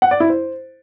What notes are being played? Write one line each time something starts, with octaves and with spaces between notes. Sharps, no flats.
F#5
D5
E4
C5